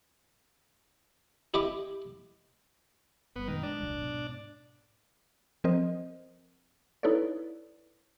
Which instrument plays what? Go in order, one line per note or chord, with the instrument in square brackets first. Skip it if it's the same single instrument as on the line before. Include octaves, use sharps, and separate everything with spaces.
[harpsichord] E4 G4 D#5 B5 D6
[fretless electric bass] G1 G3 [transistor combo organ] B3
[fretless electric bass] F#2 A#2 G#3 [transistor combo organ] D#3
[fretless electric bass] G#3 [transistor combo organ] D4
[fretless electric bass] D#1 C2 F#3
G#2 B2
[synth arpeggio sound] F3 C4 A#4 C5 D#5
D#4 E4 A4 B4 C#5 D5